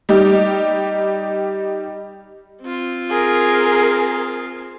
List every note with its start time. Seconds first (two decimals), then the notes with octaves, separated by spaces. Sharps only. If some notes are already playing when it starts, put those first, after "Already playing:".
0.09 G3 D#4 G4
2.62 C4 F4
3.10 G#4 A#4